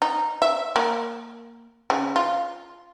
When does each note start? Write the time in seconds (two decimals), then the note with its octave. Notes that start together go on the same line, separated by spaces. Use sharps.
0.02 D#4
0.42 E5
0.76 A#3
1.90 C#3
2.16 F4